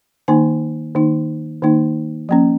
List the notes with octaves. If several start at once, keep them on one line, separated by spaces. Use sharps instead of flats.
D#3 A#3 D#4 G#5
D#3 A#3 D#4
D#3 A#3 D#4
F3 A#3 C#4